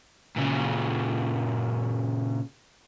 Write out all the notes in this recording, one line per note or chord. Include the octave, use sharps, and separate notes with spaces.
A#2 C#3